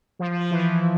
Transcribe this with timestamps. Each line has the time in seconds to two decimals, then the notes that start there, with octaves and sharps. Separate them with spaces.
0.19 F3
0.30 F3
0.40 F3
0.51 E3